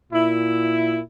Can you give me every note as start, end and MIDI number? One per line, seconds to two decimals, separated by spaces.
0.13 1.00 46
0.13 1.00 64